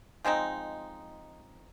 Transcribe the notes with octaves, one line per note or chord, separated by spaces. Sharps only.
F3 G#3 C4 D#4